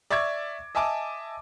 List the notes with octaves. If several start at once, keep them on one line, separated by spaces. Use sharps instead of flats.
D5 E5 C#6 D6 G#6
D#5 E5 G#5 A5 D6